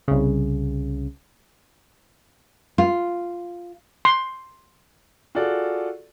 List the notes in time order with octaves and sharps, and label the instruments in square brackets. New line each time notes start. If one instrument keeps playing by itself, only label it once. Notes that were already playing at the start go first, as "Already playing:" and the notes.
[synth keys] C2 C#3
[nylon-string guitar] F4
[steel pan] C6
[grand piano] F4 F#4 G#4 A4 D5